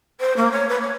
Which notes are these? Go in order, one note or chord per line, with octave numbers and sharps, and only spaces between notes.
C5
A#3
C#5
B4
C#5